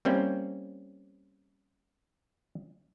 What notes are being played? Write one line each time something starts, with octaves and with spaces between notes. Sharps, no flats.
G3 A#3 C4 C#4 E4